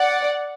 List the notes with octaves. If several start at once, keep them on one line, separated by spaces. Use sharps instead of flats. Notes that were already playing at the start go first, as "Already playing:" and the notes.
Already playing: D5 F#5